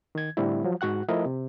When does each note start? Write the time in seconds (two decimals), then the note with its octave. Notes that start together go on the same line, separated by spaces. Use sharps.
0.15 D#3 G#6
0.37 A2 D3 G3 C4 E4
0.64 F3 F#3
0.81 G#2 F#4 F#5 F#6
1.09 F3 A3 E4 A#4 D#5
1.26 C3